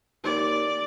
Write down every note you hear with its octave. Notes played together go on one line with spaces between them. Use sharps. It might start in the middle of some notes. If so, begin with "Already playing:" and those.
D#2 D5